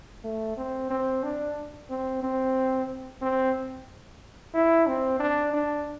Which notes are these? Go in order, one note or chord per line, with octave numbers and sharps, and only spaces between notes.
A3
C4
C4
D4
C4
C4
C4
E4
C4
D4
D4